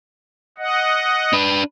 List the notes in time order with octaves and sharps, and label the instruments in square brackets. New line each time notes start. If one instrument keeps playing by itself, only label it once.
[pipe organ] D#5 F#5
[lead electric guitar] D4 B4